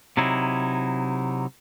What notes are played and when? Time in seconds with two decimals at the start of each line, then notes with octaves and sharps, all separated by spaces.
0.17 C3 F#3 D#4 E4